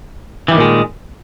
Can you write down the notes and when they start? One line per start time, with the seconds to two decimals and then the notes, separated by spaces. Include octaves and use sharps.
0.48 E3
0.51 G3
0.54 D#3
0.57 A#2
0.60 G#3